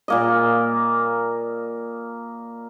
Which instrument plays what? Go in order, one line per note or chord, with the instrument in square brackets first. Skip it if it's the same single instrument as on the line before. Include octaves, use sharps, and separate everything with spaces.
[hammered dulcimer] A#2 A#3 D#5